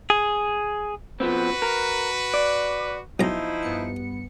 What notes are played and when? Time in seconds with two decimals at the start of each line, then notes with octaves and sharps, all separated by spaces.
0.10 G#4
1.20 F3 B3 C4 F#4 B4
1.62 A#4
2.34 D5
3.20 B1 F3 D#4 E4 A#5
3.62 G2 B3 C#7